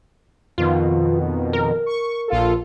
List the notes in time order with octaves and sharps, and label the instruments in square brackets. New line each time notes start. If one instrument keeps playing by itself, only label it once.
[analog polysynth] F2 B2 D#3 [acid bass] F4
[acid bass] A#4
[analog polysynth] C#6
A#1 F4 A4